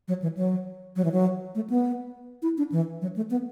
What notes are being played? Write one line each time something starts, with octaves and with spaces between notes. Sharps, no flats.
F#3
E3
F#3
F#3
E3
F#3
A3
B3
E4
D4
E3
F#3
A3
B3